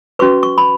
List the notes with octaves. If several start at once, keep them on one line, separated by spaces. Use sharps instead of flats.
C#4 F#4 B4 C#6
C#6
B5